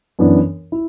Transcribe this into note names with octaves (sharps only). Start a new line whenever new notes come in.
F#2 E3 B3 D4
E4